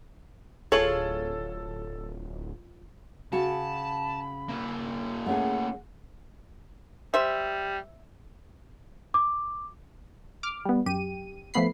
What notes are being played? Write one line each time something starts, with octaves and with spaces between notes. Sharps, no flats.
D1 F4 G#4 A4 C#5 F#7
C#3 F#4 A5 B5
A#3 E4
A3 C#4 G#4 F#5
G3 C5 E5
D6
D6 F6
G3 B3
F#2 G4 D#7
F3 A3 B3 B5 C7